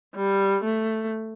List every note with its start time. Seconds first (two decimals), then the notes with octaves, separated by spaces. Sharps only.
0.16 G3
0.64 A3